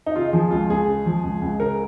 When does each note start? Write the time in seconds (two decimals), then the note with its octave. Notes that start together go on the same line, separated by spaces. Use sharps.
0.06 D#4
0.16 C#3 F4
0.33 F3 G#4
0.51 C#2 F4
0.70 C#2 G#4
0.88 C#3
1.06 F3
1.23 C#2
1.42 C#2
1.60 C#3 A#4